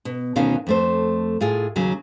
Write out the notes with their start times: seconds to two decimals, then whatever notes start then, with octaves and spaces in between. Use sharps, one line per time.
0.05 B2
0.36 D2 B2 D#3 C#4 F5
0.67 F2 A3 C5
1.41 A2 F4 G#4
1.76 D#2 C#3 F#3